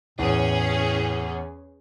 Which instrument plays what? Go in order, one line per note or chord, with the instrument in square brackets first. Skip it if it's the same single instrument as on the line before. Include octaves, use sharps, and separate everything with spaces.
[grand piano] E2 [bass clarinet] A2 [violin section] C#4 G#4